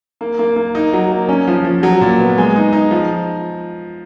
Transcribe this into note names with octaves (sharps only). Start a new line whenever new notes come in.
A#3
A#3
A#3
D#4
F#3
A#3
C#4
F3
F3
F#3
A#2
B3
G#3
D#4
D#4
F3